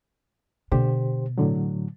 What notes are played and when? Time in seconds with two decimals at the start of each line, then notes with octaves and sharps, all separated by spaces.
0.72 B2 D3 G4 C5
1.38 A2 D3 F#3